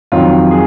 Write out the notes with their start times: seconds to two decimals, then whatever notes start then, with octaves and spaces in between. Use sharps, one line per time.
0.12 F2 D#3 F#3 F4
0.51 G#4